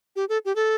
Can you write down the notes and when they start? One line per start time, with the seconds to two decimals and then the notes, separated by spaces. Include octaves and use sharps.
0.16 G4
0.29 A4
0.45 G4
0.56 A4